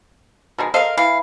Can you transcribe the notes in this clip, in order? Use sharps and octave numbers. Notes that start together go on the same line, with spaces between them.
B2 D#3 G#3
A4 A#4 C5 D#5 F5
E3 F5